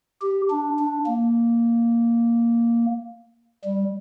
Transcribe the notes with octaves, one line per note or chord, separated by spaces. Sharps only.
G4
D4
D4
A#3
G3